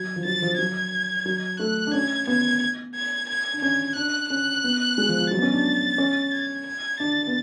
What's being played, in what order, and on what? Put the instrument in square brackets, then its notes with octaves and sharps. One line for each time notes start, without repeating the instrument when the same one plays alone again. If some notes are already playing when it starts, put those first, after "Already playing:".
Already playing: [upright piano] F#3 [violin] G#6
[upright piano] F3
[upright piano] F#3 [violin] A6
[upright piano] F3
[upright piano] F#3 [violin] G#6
[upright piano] F#3
[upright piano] A3 [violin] F#6
[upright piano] D4
[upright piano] C#4 [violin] G#6
[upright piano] B3 [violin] G#6
[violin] G#6
G#6
[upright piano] D4
[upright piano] C#4 [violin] G#6
[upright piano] D4 [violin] F#6
[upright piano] C#4 [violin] F#6
[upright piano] B3
G#3
F3
F3
[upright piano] F#3 [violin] A6
[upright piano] B3
C#4
D4
C#4
[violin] G#6
G#6
[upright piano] D4 [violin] A6
[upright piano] B3